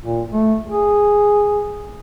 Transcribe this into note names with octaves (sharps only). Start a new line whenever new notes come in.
A#2
A3
G#4